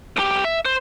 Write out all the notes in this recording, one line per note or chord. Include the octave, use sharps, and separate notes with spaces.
B1 G4
E5
C5